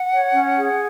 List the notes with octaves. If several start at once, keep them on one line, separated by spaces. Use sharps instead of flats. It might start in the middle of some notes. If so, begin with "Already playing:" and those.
Already playing: F#5
C#5
C#4
G#4